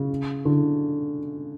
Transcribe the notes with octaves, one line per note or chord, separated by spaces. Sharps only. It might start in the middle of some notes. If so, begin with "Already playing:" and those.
Already playing: C#3
D3